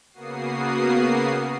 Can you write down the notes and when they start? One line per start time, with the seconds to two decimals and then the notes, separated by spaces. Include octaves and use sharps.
0.12 C#3 A#3 B3 F#4 D#6 C7